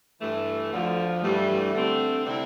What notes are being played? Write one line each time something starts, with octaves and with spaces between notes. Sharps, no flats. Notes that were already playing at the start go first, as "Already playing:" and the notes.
G2 E3 A3
D2 D3 F3
G2 E3 G3 A3
D3 A3 C4
C3 G3 C4 E4